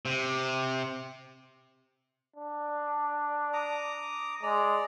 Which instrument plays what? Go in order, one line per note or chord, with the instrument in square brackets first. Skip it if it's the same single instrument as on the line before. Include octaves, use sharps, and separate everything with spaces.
[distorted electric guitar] C3
[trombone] D4
[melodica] A#5 D6 D#6
[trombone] G#3 [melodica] D5 A#5